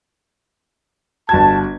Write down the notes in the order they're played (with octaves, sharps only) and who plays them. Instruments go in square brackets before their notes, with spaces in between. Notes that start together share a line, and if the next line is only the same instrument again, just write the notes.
[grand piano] G1 F#4 G#6 [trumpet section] A5